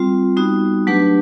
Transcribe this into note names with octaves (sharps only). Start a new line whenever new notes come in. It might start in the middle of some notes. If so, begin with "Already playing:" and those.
Already playing: G3 C4 F4
G3 B3 D#4 F#4
F#3 A3 D4 G4 B4